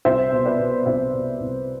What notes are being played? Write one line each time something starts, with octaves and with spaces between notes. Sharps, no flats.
C2 C5 E5
B2
B4 D5
B2
C2 C5 E5
B2
C2